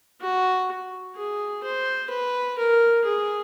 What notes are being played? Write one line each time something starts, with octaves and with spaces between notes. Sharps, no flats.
F#4
G#4
C5
B4
A#4
G#4